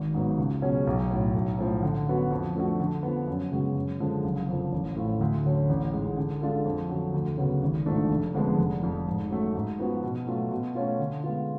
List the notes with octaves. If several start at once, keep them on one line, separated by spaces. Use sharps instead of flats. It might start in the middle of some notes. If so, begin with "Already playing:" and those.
Already playing: G#1
G#2 F#3 B3
C#2
B2 F#3 C#4 G#4
B1
A2 F#3
B1
A2 F3
D3
F#3 B3 F#4
F2
F3 A3 D4 F#4
D3
F3 B3
F#2
C#3 G#3 B3 F#4
F#2
D3 F3 G#3
F#1
F2 D3 F3
A1
A2 F3 A3 F4
D2
D3 F#3 C#4
A1
G#2 G#3
D3
G#3 D4 F4 A4
F2
D3 F#3
D2
C#3 F#3 B3
G#1
G#2 F3 A3 D4
F1
F2 D3 G#3 B3
F1
F2 F3
G#2
F#3 A3
G#2
F3 B3 F#4
B2
F#3 A3 F4
B2
A3 C#4 F4
D3
G#3 B3 F4